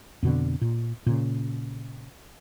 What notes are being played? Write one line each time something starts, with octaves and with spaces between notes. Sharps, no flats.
F2 B2 D3
A#2
A#2 C#3